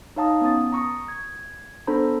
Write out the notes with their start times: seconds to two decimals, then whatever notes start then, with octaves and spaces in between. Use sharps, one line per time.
0.16 D#4 C#5 F5 A5 A#5 D#6
0.41 B3 C#4 D#6 A6
0.73 A#5 C#6 D#6
1.08 G#6
1.87 B3 D4 A4 C5 A#5 B5